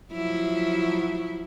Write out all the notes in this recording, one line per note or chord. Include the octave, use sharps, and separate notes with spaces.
F3 F#3 E4